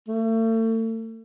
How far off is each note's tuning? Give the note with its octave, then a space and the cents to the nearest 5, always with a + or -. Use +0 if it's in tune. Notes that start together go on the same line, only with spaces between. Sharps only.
A3 +35